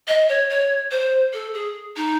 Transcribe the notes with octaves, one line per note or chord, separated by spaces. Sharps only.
D#5
C#5
C#5
C5
A4
G#4
D#4